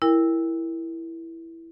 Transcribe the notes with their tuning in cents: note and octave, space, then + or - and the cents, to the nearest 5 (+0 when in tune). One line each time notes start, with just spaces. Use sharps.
E4 +5 A#4 +0 G5 +40